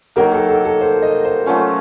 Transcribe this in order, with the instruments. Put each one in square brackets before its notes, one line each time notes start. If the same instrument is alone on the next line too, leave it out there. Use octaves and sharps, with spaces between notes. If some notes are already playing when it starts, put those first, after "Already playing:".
[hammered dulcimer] D#3 F#3 A#3 [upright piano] A#4
[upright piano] A4
A4
A4
C5
D#5
C5
[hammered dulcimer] F#3 A3 C#4 F4